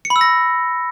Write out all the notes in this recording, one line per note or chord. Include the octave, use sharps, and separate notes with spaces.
C#7
B5
E6
A#6